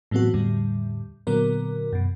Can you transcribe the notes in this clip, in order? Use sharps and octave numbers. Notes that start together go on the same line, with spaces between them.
A2 E3 F#3 B3 C4 F#4
E2 A2 D3 G3
A#2 D3 F#3 B3 A#4
F#2 B2